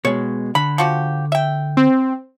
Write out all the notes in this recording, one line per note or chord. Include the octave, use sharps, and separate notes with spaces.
B2 G#3 C#5
D3 B5
F3 F#4 G4
E5 G5
C4